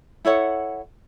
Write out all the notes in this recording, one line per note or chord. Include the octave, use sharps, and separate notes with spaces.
E4 A4 C#5 F#5